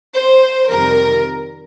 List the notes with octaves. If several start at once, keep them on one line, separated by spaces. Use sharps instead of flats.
C5
F2 C3 D#3 G3 A#4